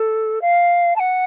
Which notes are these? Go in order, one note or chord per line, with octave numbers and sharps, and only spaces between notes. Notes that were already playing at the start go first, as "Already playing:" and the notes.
Already playing: A4
F5
A5
F#5